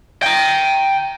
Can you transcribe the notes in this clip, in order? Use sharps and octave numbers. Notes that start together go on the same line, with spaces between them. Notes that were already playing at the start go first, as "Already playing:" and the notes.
G5 A#5